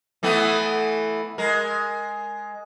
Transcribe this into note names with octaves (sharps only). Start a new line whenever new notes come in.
E3 A3 B3
G#3 A#4